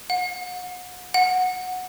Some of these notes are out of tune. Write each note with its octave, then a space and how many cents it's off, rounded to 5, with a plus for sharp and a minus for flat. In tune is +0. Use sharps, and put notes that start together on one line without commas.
F#5 -35
F#5 -10